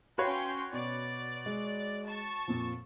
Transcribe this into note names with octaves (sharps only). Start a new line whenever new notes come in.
C#4 F#4 B4 C#5 F5 G5 C6
B2 D5
G#3
A5 C#6
F2 A#2 F3